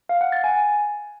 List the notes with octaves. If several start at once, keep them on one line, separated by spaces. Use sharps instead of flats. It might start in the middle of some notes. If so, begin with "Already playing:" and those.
F5
F#5
A6
G#5